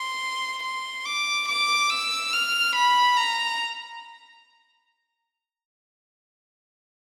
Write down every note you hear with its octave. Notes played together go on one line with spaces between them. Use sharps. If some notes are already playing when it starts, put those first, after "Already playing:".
Already playing: C6
C6
D6
D6
E6
F6
B5
A#5